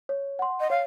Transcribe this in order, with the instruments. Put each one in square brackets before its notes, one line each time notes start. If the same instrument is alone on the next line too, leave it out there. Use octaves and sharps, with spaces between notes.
[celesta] C#5
F#5 C6
[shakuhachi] D#5
[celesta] C#5 [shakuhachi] F5